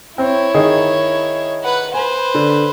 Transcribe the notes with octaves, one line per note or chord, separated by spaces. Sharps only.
C4 E4 C#5
D#3 D#4 G#4
B4 F#5
B4 C5 G#5
D3